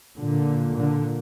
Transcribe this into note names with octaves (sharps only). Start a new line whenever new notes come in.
A#2 D3
D3